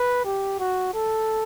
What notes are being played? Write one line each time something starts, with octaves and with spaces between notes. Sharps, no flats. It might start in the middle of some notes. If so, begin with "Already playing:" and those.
Already playing: B4
G4
F#4
A4